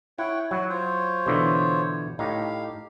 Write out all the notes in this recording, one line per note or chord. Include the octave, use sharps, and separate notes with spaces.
E4 C#5 F#5 G5
F#3 E4 F#4
F4 C5 C#5
B2 D3 E3
A2 D#4 G4 F5